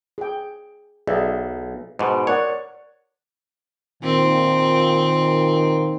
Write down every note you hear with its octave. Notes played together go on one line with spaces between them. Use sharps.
G#4 G5
B1 G#4 D5 E5
G#2 B2
A#4 C#5 D5 F#5
A#2 D#3 C4